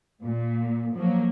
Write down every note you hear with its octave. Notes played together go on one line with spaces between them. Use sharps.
A#2
F3 F#3 A#3